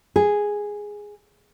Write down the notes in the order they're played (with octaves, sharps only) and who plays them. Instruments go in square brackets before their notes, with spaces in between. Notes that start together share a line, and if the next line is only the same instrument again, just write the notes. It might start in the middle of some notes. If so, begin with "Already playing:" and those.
[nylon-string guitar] G#4